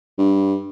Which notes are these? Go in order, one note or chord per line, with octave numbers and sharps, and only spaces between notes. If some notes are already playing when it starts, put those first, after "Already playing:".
G2